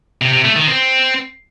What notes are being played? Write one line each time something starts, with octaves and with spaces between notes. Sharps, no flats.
C3
C3
A3
D#3
C4